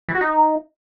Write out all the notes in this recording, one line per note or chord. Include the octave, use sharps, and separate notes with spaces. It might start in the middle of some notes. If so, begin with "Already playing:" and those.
E3
F#4
D#4